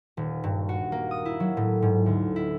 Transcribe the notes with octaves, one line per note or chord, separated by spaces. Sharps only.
D#1
G2
F#4
A#3
D#6
E4
F#3
A2
G#2
D2
E4